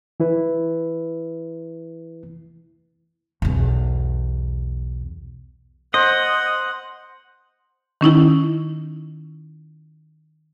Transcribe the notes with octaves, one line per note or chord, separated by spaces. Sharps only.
E3 E4 B4
B1 E2
C5 D#5 F#5
D#3 C#4 D#4 E4